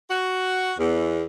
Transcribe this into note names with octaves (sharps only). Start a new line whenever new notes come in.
F#4
E2